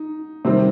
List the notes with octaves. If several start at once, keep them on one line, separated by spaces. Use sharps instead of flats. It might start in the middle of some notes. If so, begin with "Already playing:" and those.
Already playing: D#4
C3 D#3 G3 C4